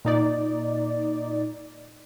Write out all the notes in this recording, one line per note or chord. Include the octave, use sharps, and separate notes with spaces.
A#2 D#4 D5